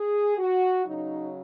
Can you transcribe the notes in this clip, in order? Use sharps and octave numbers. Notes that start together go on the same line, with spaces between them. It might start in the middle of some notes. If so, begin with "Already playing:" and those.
Already playing: G#4
F#4
C#3 F#3 D#4